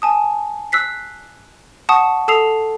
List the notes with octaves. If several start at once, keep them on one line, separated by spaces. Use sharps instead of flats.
G#5 A5 D#6
E6 F#6 B6 C7
F#5 A5 C#6 D#6
A4 A5 D#6 E6 C7 F7